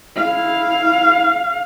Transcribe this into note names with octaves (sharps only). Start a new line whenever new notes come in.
E4 F5